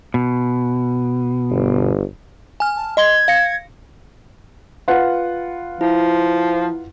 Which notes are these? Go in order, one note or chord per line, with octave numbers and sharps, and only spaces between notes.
B2
G1
G#5 F6
A5
D#5 C6 G#6 G7
F5 A#6 C#7
F4 B4 F#5
F3 E4